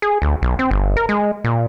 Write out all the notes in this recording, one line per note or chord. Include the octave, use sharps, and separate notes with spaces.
G#4
D2
B1
C4
G1
A#4
G#3
A#2